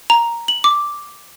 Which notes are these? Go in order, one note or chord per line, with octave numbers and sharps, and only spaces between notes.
A#5
F#7
D6